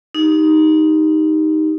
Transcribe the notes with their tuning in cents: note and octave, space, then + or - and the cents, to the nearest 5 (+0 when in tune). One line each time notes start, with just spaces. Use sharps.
D#4 +5 G4 +0